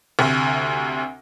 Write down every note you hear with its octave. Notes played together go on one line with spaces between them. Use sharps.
D2 C3